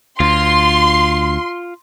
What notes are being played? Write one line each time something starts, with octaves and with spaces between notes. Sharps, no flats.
D2 F4 C6